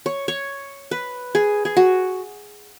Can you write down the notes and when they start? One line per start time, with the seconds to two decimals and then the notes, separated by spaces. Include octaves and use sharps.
0.06 C#5
0.28 C#5
0.91 B4
1.35 G#4
1.65 G#4
1.77 F#4